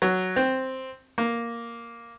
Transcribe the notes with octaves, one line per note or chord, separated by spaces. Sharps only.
F#3
C4
A#3